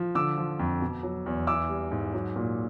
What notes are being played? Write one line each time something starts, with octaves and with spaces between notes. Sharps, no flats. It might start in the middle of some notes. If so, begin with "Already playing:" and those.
Already playing: F3
D3 D6 E6
F3
F2
B2
F#3
E2
E3 D6 E6
G3
G#2
F#3
A#2